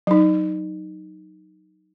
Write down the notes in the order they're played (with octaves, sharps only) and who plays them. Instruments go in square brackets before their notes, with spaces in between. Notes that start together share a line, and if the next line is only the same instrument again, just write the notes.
[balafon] F#3 D#4